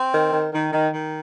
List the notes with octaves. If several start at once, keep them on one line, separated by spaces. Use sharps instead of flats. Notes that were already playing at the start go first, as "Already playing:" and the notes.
Already playing: C4
D#3
D#3
D#3
D#3
D#3